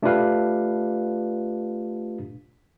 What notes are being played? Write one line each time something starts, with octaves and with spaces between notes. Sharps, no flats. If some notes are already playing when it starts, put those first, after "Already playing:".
A3 D4 F4 G4 B4 F5